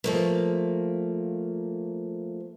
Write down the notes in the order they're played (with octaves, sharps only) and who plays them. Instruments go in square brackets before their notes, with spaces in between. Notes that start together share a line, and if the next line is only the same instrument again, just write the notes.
[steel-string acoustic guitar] F3 A3 A#3